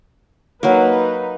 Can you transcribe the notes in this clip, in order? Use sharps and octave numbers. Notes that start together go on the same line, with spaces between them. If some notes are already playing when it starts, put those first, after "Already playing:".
F#3 A#3 D#4 B4